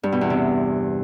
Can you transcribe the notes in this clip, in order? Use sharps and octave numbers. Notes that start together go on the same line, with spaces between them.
G2
B2
E2
C3